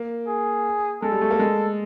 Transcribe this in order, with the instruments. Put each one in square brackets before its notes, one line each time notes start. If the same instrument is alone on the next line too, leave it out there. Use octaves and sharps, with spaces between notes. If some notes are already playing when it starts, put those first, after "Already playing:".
Already playing: [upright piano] A#3
[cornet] G#4
[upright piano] G#3 [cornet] A4
[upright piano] G3
A3
A#3
G#3